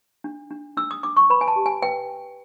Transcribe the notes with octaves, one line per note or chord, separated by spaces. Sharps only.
D4
D4
D4 E6
D#6
D4 D6
C#6
B4 B5
G#5
A5
G4
G#5
B4 G5